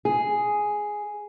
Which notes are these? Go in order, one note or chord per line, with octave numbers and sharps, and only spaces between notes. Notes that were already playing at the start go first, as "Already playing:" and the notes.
G#4